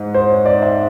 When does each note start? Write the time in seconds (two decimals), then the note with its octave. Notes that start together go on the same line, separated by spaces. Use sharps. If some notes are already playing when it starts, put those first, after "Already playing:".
Already playing: G#2
0.14 C5
0.30 C#5
0.46 D5
0.62 E5